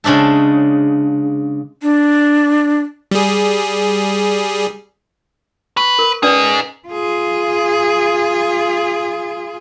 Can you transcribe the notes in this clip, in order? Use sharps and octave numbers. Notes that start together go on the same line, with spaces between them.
C#3 G#3 D4 E5 A5
D4
G3 G#4
B4 C#6
A#4
C#4 D#4 G#4 B4 D5
F4 G#4